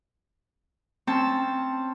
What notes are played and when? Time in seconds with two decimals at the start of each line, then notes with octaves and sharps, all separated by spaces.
1.07 C4 C#4 A5